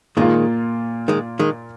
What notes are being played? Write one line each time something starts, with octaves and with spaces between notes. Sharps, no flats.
A#2 D#3 G#3 A#3 F4
D#3 G#3
D#3 G#3